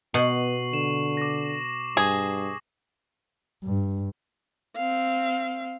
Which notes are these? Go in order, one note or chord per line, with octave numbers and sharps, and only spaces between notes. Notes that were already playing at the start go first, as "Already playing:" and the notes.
B2 B3 C#6 C7 F#7
D3 E7
D6 A#6
G2 G#4
G2
C4 F5